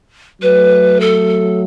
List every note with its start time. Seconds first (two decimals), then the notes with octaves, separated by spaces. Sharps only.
0.42 F#3 A3 B4
1.00 A4